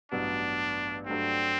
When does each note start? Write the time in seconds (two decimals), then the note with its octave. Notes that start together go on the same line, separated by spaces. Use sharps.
0.12 A1 G2 F#3 B3 D4
1.07 G2 F#3 A3 C4 D4